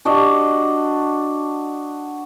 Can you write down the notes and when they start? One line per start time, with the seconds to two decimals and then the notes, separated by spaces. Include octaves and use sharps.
0.05 D4 F#4 D5 D#5